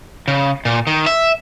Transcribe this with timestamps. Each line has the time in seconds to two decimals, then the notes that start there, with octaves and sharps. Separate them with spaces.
0.28 C#3
0.65 A#2
0.87 D#3
1.06 E5